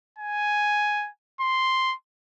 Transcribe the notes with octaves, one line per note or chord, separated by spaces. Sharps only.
G#5
C6